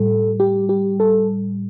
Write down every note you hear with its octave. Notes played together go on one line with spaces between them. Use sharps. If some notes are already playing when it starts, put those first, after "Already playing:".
Already playing: A2 G3 A4
G4
G4
A4